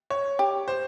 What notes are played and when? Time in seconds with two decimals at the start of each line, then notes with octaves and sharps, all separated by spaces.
0.10 C#5
0.39 G4
0.68 C5